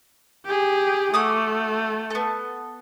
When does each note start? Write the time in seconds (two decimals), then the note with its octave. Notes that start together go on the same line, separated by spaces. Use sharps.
0.46 G4 G#4
1.14 A3 F#4 D6 D#6
2.11 B3 A4